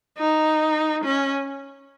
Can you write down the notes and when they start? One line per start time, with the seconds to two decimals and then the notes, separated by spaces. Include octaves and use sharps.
0.18 D#4
1.05 C#4